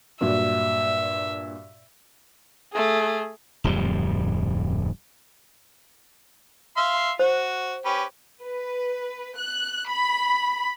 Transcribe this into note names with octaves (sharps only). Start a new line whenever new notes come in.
G2 A#2 F#3 E5
A3 G#4
D1 F2 G#2 G3
E5 F5 C6
F#4 C5
C#4 G4 B4
B4
F#6
B5